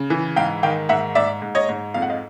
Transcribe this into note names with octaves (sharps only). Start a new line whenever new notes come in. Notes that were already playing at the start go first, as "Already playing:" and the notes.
Already playing: C#3
E3
G#2 F5 G5
D#3 F5 G5
G#2 E5 F#5
G#2 D5 E5
G#2
C#5 D#5
G#2
F2 F5
F#5
D#5 F5